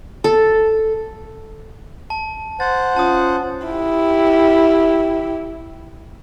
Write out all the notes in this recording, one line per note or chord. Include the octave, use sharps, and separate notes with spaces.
A4
A5
C5 F#5 A6
C#4 F4 A5 D#6
E4 G4